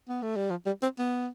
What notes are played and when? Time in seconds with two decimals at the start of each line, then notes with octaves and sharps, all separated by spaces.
0.08 B3
0.22 A3
0.36 G3
0.50 F3
0.66 G3
0.82 C4
0.99 B3